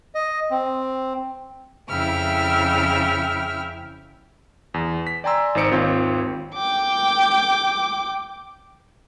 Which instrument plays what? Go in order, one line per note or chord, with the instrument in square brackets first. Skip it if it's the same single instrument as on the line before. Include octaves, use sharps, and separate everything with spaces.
[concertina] D#5
C4
[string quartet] F2 C#3 E4 E5 G5 F6
[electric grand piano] E2
B6
D5 G5 G#5 A#5 C6 E6
G#1 D#4 C5 C#7 D7
G#1 D#2 C4 F4 C#5 G6
[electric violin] G5 D6